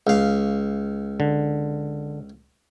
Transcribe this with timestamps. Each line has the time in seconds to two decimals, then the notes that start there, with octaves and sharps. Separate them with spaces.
0.07 C#2 F5
1.20 D3